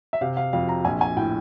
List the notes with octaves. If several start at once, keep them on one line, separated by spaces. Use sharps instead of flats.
E5
C3 F5
F5
F2 F5
A#5
A#1 G#5
G#5
A2 G5